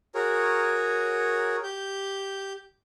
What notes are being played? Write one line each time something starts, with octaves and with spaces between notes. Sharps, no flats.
F#4 G#4 A#4 C#5
G4 G6